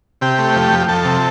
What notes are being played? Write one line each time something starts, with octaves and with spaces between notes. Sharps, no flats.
C3 G4
A3
F2
F2
F2 A4
C3